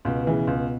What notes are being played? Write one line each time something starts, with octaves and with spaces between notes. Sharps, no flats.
C#2 B2
C#3 E3
C#2